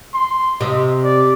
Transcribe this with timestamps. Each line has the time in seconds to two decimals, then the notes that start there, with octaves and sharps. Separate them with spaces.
0.14 C6
0.61 C3 D#5
1.04 D5